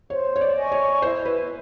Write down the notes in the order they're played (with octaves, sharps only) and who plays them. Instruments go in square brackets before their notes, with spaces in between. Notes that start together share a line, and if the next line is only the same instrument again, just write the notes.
[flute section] C5 [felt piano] C#5
[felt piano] C#5
D5
[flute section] D#5 G#5 C#6
[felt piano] C#5
[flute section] E4 [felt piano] C5
[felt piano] B4